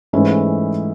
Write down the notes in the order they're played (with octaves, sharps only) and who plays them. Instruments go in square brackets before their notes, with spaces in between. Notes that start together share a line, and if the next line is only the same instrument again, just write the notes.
[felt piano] G#2 E3 A3 C#4 E4